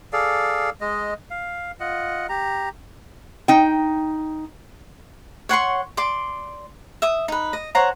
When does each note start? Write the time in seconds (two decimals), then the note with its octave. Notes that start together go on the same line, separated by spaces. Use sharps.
0.13 G#4 A4 D5 F5
0.81 G#3 D#5
1.31 F5
1.80 F4 D#5 F#5
2.29 G4 A#5
3.48 D#4 G5
5.49 C#5 F#5 C6 C#6
5.97 D5 C6 D6
7.02 E5 D#6
7.28 D#4 B4
7.53 D#5
7.75 C5 C#5 F#5 A#5